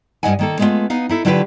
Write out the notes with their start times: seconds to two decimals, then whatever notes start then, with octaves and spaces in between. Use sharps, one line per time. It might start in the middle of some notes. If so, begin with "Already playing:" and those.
0.23 G2 B3 D4 D#5 F#5 G#5
0.39 D#3 A#3 A4
0.59 G#3 A3 B3 D4 F4
0.90 B3 D#4 F5
1.09 D#4 E4 A4
1.25 D3 F#3 D4 F4 G4 B4